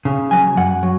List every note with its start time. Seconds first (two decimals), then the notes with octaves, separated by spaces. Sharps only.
0.05 C#3
0.31 F#3 G#5
0.57 F#2 F#5
0.83 F#3